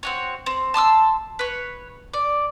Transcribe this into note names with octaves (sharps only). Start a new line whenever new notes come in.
C4 F#4 C#5
C4
A5 C6 D#6 E6
B4 C#5
D5